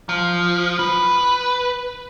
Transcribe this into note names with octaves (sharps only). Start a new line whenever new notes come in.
F3
B4